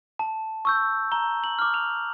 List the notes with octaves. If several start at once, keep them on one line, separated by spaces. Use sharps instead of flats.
A5
C#6 E6 G6
A#5 G7
F#7
D6 F6
F7